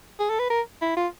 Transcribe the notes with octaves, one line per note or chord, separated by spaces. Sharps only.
G#4
A4
B4
A#4
E4
F4